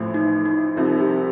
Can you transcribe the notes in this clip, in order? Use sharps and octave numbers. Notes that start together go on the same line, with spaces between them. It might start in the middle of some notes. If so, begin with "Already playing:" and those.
Already playing: A1 A2 F3
D#4
D#4
C2 C3 F3 D#4
G4